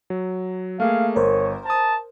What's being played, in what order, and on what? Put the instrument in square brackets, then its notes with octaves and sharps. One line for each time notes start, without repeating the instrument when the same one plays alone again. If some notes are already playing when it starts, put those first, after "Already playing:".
[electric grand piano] F#3
[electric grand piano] A3 A#3 G#4 [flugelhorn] F5
[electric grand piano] G1 [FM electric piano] A#4 C5 [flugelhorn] C#5
[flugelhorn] A5 [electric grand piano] A#5 D#6